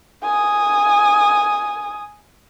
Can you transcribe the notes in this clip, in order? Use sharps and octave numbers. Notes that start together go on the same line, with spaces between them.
G#5 D#6